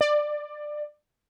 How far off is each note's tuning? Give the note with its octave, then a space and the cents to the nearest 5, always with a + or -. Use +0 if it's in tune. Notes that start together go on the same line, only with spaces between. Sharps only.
D5 +20